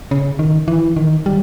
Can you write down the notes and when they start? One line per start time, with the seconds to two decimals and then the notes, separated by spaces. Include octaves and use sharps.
0.11 C#3
0.39 D#3
0.68 E3
0.96 D#3
1.26 G3